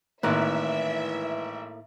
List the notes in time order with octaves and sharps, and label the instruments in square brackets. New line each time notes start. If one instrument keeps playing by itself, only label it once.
[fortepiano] G#1 G#3 F#6 [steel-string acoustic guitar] A2 A#3 [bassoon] E3 [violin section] E5